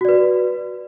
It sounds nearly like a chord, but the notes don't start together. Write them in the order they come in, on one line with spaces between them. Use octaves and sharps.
F#4 D5 B4